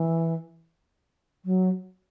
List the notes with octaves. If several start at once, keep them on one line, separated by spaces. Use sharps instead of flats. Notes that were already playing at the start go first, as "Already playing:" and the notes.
Already playing: E3
F#3